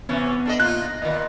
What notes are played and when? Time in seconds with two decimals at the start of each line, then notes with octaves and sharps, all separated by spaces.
0.09 C3 E3 B3 C#4
0.46 D4 A4 D#5
0.60 A#2 D#4 F4 F#6
0.82 A#6
1.02 A#2 D#3 D#5